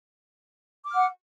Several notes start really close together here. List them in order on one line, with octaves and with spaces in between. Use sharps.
D6 F6 F#5